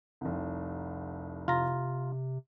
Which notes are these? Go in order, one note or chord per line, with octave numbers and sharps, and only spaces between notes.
F1 C2
C3 F4 A#5